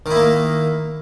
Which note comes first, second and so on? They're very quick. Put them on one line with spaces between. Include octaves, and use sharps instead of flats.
D#3 E4 A#3